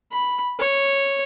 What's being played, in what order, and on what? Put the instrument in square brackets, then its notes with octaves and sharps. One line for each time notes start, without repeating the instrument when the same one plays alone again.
[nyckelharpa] B5
C#5